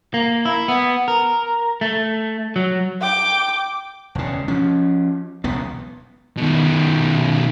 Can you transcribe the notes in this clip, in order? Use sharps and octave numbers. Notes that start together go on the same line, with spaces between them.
A#3
E4
B3
A#4
A3
F#3
G5 D6
E1 C#3
F3 C#4
E1 B1 C#3 B3
B2 D#3